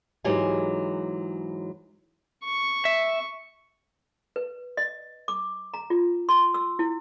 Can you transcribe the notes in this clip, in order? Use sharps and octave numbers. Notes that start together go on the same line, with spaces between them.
G#2 E3 F#3 G#3 G4 G#5
C#6
E5
B4
D#5
D6
A#5
F4
C6
E6
E4